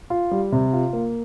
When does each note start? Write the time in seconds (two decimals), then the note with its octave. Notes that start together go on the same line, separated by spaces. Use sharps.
0.10 F4
0.31 G3
0.52 C3
0.73 F4
0.93 A#3